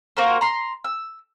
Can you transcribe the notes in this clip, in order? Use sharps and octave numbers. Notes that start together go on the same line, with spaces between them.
A#3 F#4 A#4 C5
A#5 C6
E6